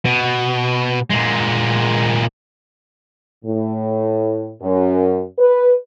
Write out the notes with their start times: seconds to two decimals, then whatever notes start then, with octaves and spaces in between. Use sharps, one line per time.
0.05 B2
1.10 A#2 G#3
3.45 A2
4.62 F#2
5.38 B4